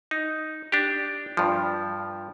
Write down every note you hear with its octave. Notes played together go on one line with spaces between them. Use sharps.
D#4
D4 G4
G2 F3